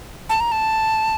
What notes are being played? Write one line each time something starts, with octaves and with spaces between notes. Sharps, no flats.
A5
A#5
A5